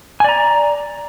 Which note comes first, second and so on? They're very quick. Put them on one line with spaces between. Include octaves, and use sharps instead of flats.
G#5 D5 A#5